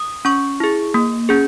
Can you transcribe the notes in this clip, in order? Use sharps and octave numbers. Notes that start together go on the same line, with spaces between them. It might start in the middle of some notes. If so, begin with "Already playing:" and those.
Already playing: D#6
C#4 C#6
E4 G#4
A#3
C#4 G#4